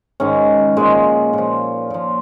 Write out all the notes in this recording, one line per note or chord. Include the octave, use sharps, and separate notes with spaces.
G#2 D#3 C#4
A#2 F3 G#3
A#2 F3
A#2 F3